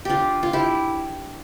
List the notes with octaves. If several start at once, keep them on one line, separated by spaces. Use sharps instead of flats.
D4 F4 G4
F4
E4 G4